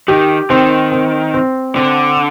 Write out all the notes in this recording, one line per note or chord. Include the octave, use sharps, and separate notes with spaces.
D#3 G4
D#3 C4
C4
C4
D3 C4